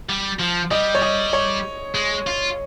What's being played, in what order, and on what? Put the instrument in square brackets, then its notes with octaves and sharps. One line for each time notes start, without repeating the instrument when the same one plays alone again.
[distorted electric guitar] G3
F3
[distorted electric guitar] G3 [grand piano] D#5
[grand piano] C#5
D#5
C#5
[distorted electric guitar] G#3
F4